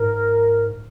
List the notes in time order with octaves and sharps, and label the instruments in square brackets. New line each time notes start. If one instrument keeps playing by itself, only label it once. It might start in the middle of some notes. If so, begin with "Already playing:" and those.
Already playing: [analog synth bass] G#2 [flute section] A#4